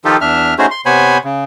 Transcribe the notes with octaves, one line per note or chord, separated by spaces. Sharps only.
D#3 F3 D#4 F4 G4 A4
E2 D4 E5 F6
A3 C#4 D#4 F#4 G#4 C5
C6
C3 B3 C5 C#5 G#5 B5
C#3